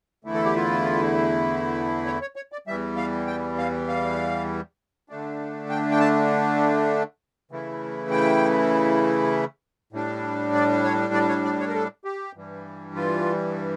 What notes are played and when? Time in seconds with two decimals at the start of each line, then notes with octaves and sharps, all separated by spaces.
0.24 E2 D3 A3 E4
0.34 A4
0.44 G4
0.56 F4
2.06 C#5
2.21 C#5
2.36 C#5
2.52 D5
2.67 E2 E3 G3 E5
2.97 F5
3.27 G5
3.58 F5
3.88 F5
5.09 D3 A3 D4
5.70 G5
5.91 G5
6.00 A5
7.51 C#3 E3 A3 E4
8.11 G5
9.93 A2 G3 D4
10.54 D5
10.84 C#5
11.14 D5
11.29 C#5
11.45 D5
11.60 C#5
11.68 A#4
11.74 A4
12.05 G4
12.35 G2 E3 G3
12.96 F4